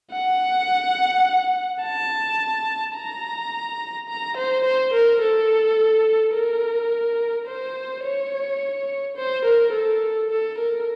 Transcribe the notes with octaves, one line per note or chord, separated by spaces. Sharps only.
F#5
A5
A#5
A#5
C5
C5
A#4
A4
A#4
C5
C#5
C5
A#4
A4
A4
A#4